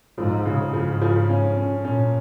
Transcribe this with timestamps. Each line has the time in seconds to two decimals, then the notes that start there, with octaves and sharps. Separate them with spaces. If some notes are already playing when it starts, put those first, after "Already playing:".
0.17 G#2 F3
0.45 C#3
0.73 G#2 F3
1.01 F3
1.29 C#4
1.57 C#4
1.85 A#2 C#4